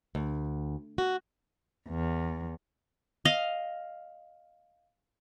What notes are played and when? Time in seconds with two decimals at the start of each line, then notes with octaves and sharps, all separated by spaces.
0.15 D2
0.98 F#4
1.87 E2
3.25 D#5 F5